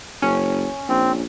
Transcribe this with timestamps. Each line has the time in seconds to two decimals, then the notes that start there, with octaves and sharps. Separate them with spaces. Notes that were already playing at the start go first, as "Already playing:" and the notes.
0.22 F#1 C#4
0.89 A#1 C4